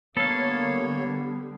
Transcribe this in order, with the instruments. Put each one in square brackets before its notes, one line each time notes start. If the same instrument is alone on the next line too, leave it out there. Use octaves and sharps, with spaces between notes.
[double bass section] D3 G3 [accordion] A#3 C#5 [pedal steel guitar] B3 F5 [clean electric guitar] A4